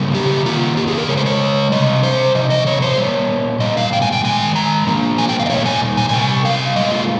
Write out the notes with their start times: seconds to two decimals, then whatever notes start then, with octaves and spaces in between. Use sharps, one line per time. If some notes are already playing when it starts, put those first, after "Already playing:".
Already playing: C#3 G3 A#3
0.15 G4
0.45 D#3 A#3 F4
0.77 G4
0.88 G#4
0.98 A#4
1.08 C#3 G#3 C#5
1.17 C5
1.26 C#5
1.72 C3 G3 D#5
2.03 C5
2.35 C3 F3 D#5
2.50 D#5
2.67 C#5
2.82 C5
2.98 A#2 G3 C#5
3.60 A#2 G3 D#5
3.77 F5
3.93 G5
4.02 G#5
4.12 G5
4.24 D#3 G#3 G#5
4.56 A#5
4.87 A#2 F3 A#3
5.18 G#5
5.29 G5
5.40 F5
5.46 D#5
5.50 A#2 G3 A#3 C#5
5.66 G#5
5.97 G#5
6.09 G#5
6.13 C3 G3 G5
6.45 F5
6.76 A#2 G#3 D#5
6.92 F4